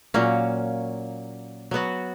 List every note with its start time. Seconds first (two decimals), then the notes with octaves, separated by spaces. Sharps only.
0.14 A#2 F#3 A#3 C#4
1.71 F#3 B3 F#4